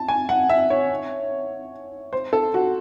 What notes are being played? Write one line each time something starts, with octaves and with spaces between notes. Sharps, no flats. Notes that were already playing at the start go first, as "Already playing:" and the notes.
Already playing: A5
G#5
F#5
E5
C#5
C5
A4
F#4